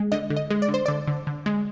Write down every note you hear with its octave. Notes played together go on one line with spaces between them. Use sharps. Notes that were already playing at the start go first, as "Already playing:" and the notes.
Already playing: G#3
D3 D#5
D3
D#5
G#3
D5
D3
C5
D3 D5
D3
D3
G#3